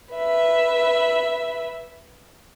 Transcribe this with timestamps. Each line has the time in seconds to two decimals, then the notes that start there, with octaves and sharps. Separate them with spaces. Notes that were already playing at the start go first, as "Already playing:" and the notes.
0.13 B4 E5